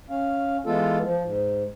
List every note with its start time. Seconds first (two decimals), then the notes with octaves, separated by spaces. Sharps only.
0.10 C#4 F5
0.66 E3 G#3 B3 F4 A4
1.05 F3
1.24 G#2